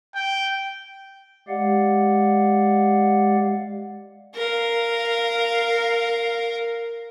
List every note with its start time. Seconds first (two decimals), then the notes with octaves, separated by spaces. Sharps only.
0.15 G5
1.48 G#3 G4 D5 F5 F#5
4.35 A#4 F5